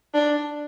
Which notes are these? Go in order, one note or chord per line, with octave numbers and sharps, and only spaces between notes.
D4